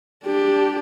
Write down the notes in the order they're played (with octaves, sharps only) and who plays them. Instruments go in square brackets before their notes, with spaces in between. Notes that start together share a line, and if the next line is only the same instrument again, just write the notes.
[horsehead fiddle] D4 G4